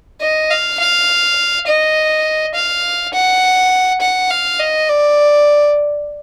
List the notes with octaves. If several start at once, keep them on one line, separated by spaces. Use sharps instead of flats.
D#5
F5
F5
D#5
F5
F#5
F#5
F5
D#5
D5